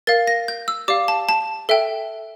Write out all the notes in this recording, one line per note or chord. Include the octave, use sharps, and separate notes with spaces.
A#4 F5 A6
A#6
G6
E6
G4 D5 F5 D6
A5
A5
A4 E5 G5